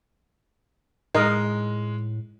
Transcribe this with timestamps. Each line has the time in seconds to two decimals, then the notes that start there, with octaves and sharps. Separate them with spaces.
1.14 A2 G#3 D#4 A#4 D#5